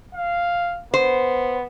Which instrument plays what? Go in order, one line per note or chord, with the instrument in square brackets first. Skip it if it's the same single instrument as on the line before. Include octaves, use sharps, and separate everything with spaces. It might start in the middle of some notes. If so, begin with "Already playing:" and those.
[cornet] F5
[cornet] B3 [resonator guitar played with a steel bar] C5